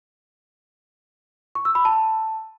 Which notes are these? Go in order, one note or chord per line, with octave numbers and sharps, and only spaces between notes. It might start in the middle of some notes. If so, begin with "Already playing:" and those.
C#6
E6
B5
A5